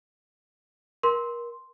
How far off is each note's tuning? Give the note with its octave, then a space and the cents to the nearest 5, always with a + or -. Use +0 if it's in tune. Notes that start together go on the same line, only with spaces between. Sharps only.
A#4 +30 C6 +0